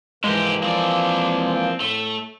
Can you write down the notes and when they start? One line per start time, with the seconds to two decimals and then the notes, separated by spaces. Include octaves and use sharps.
0.24 G#2 E3 F3 G#3 A#3 G4
0.63 F3 C4 D5
1.80 A2 A3